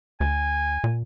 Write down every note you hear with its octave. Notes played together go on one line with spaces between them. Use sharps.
D2 G#5
A#2